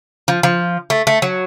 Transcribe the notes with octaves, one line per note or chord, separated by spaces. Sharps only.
F3
F3
A3
A3
F#3